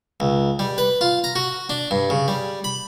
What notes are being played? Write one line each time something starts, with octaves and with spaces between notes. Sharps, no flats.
C#2
G3
B4
F4
A#5
F#4
D4
G2
C#3
G3
B5